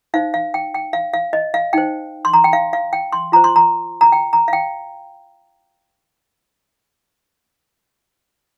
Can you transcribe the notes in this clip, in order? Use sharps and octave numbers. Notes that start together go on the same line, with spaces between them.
D#4 C5 F5
F5
G5
G5
F5
F5
D#5
F5
D#4 C5 G5
C6
A#5
G5
F5
F5
G5
C6
F4 C5 A#5
C6
A#5
A#5
G5
A#5
F5
G5